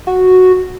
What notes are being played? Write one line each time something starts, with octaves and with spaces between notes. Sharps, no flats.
F#4